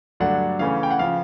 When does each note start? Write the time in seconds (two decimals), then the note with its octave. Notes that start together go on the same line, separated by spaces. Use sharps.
0.20 G2 D3 F#3 A3 D4 F#5
0.59 C#3 E3 A3 C#4 F5
0.83 G5
0.91 F#5
0.99 C#3 F3 F5